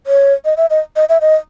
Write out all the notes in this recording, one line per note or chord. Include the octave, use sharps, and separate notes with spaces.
C#5
D#5
E5
D#5
D#5
E5
D#5